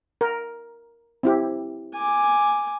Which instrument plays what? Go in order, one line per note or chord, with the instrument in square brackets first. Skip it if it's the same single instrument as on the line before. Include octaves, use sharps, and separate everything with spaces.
[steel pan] A#4
C4 E4 G4
[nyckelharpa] G#5 D6